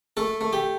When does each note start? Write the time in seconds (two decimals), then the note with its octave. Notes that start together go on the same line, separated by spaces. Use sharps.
0.17 A3 A4
0.41 A3
0.53 G4